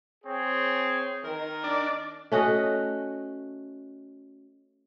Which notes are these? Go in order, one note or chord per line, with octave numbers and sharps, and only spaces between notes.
C4 G#4 C#5
D#3 A#4
D4 D5
A3 C#4 F#4 D#5